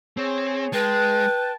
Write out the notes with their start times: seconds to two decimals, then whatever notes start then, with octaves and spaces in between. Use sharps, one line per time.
0.17 C4 G#4 C#5
0.73 G#3 B4 G5 A5